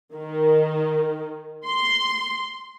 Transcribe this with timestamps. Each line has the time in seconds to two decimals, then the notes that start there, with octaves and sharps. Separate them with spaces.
0.13 D#3
1.67 C6